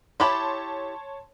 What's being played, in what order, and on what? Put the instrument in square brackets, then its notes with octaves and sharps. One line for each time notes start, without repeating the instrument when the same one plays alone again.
[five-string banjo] E4 G4 B5 [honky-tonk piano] C#5 A5 C6